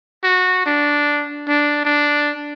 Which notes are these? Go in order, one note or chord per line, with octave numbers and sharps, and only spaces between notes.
F#4
D4
D4
D4